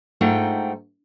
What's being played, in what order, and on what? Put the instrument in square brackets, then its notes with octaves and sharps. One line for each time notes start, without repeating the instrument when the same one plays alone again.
[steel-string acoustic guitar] G#2 A3 D#4 F4 F#5 G5